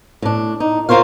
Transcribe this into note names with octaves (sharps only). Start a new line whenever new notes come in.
A2 D4
D#4
F4 A#4 C5 C#5 F5